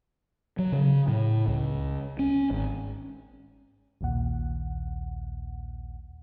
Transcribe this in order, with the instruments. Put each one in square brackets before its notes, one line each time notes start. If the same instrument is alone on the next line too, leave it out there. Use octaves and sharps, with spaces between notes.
[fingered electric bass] F#3
C#3
A2
C#2
C#4
G#1
[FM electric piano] A#1 D#2 A#2 F#5